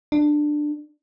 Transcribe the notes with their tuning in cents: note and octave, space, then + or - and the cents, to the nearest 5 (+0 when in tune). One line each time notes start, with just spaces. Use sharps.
D4 +15